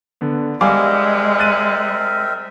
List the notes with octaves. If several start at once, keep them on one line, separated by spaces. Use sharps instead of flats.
D3 B3
G3 G#3 C4 A#4 E5 F5 G#5 D6
F#6 A6 D#7